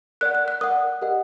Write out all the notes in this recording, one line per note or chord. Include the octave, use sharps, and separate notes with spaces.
A#4 D5 F#5 F#6
F#6
F#6
A#4 D5 F#5 D#6
G4 A#4 D#5 F#5